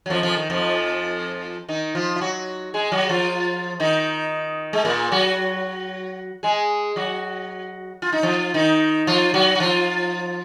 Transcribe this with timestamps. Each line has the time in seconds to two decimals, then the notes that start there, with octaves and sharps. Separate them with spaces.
0.06 F#3
0.10 F2 F3
0.23 F2 F3
0.37 D#3
0.50 F2 F3
1.69 D#3 D#4
1.95 F3 F4
2.16 F4
2.21 F#3 F#4
2.74 G#3 G#4
2.92 F#3 F#4
3.09 F3 F4
3.80 D#3 D#4
4.73 G#3
4.85 A#2 A#3
5.12 F#3 F#4
6.43 G#3 G#4
6.96 F#3 F#4
8.02 F4
8.13 D#4
8.23 F3 F4
8.54 D#3 D#4
9.07 F3 F4
9.34 F#3 F#4
9.55 F#4
9.60 F3 F4